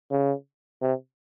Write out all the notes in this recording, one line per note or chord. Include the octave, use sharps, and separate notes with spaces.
C#3
C3